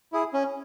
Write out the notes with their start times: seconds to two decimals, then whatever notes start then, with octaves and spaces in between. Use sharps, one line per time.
0.13 E4 G#4
0.33 C#4